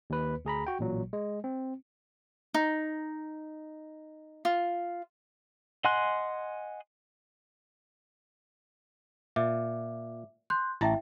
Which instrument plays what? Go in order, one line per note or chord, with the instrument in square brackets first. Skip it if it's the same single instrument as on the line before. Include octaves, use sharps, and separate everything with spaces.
[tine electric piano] D#2 B4
D2 G#4 A#5 B5
F#4 G5
A1 A#2 F#3
G#3
C4
[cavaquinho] D#4
F4
[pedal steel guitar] D#5 F#5 G#5 C6 F#6
[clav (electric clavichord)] A#2 [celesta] E5 D6
[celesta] C6 F#6 G6
[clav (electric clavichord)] A1 A5 A#5 [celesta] E4 E5 G5